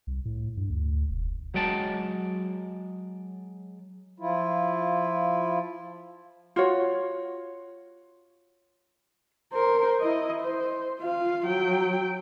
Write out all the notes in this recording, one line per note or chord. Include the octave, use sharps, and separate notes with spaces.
C2
A2
G2
D2
E1
F#3 G#3 G5 A5
F3 E4 F4
F4 F#4 C#5
A#4 C5
E4 D#5
C5
F4 F5
F#3 G5